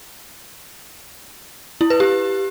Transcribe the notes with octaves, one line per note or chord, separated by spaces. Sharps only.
E4
B4
G4